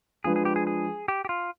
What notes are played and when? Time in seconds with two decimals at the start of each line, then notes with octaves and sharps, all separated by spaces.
0.24 F3 G#3 D4 F4 G#4 B4
0.36 G#4
0.45 G4
0.56 G#4
0.67 G#4
1.08 G4
1.25 G4
1.29 F4